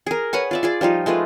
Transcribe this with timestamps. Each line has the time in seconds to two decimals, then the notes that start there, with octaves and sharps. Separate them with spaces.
0.07 G#4 A#4
0.33 B4 C#5 F#5 G#5
0.51 F4 D5 E5
0.63 F4 G#4 D5
0.81 F3 G3 D#4 F4
1.06 G#3 A3 F4 B4